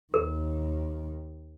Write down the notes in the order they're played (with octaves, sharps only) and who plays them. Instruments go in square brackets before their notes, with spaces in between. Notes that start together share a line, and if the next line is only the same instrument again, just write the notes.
[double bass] D#2 D#3 [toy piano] A#4